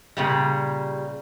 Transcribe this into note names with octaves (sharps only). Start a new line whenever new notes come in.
A#2 C#3 G3